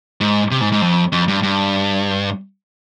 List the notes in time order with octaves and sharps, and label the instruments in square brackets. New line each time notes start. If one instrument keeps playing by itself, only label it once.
[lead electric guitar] G#2
C3
G#2
G#2
F2
F2
G2
G2